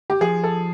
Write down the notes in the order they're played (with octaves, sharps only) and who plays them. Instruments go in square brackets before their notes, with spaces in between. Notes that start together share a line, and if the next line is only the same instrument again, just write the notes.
[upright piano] G4
[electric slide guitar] F3 [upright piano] G#4
[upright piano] A4